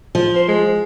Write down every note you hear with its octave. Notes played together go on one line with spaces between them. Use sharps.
F3
C5
G#3